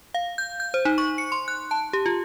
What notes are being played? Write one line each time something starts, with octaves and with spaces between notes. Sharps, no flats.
F5
G6
G6
C5
D#4
C#6
C#7
C6
F#6
A5
G4
F4